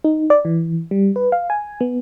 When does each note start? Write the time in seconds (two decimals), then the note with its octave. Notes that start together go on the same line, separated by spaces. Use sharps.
0.04 D#4
0.30 D5
0.45 E3
0.91 G3
1.16 B4
1.32 F5
1.50 G#5
1.81 B3